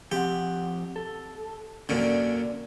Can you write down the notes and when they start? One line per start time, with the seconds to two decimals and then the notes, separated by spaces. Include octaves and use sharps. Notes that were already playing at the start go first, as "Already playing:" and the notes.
0.12 F3 C4 G4 F#5
0.96 A4
1.89 F#2 A#2 D3 C#4 A#4 D5